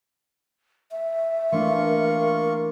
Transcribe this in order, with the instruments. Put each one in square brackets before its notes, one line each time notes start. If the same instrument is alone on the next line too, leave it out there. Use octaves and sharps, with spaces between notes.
[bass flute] E5
[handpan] E3 A3 D4 [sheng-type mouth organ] A#3 F4 C#6 [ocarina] A#4